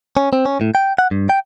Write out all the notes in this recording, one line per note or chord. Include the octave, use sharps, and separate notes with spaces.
C#4
C4
C#4
A2
G5
F#5
G2
G5